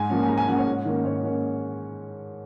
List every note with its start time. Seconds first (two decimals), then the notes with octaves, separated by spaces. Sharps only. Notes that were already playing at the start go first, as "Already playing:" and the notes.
Already playing: G#2 G#5
0.10 F3 A#3 C#4
0.23 G#5
0.28 G#2 A#5
0.38 G#5
0.47 F3 A#3 C#4 F#5
0.58 C#5
0.67 G#2
0.85 D#3 A#3 C#4
1.04 G#2 C#5
1.23 D#3 A#3 C#4